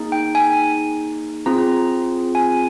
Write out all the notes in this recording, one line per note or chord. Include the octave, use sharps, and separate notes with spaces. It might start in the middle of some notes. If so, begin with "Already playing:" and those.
Already playing: A#3 D#4 G#4
G5
G#5
C4 F4 G#4 A#5
G#5